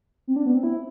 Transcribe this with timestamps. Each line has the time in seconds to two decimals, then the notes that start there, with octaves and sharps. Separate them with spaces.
0.27 C4
0.36 D4
0.46 B3
0.54 C4
0.63 E4